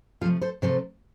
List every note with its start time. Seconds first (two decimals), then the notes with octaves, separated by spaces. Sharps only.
0.21 C3 F3 A3 F4 A4
0.42 A4 C5
0.62 C3 F3 A3 A4 C5